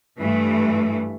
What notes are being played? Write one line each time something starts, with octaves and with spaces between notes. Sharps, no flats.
G2 E3 A3